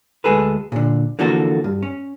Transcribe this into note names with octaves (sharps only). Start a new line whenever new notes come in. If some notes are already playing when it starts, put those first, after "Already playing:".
D2 G#3 G#4 A4 B4
A#2 D3
D3 E3 F3 A#3 F#4 A4
G2
C#4